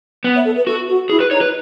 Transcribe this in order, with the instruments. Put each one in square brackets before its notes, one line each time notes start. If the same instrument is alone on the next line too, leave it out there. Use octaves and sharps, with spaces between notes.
[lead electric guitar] B3
[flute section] C#5 E5
A4
B4
[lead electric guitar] F#4 [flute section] A4
[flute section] F#4
[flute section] E4 [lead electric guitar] G#4
[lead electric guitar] B4
[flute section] D#4 [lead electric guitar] C#5
[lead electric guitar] B4